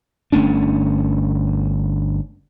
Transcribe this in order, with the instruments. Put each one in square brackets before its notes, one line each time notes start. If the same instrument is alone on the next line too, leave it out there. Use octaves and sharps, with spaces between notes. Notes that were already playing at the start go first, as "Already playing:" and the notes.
[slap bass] G1 A3 C#4 D4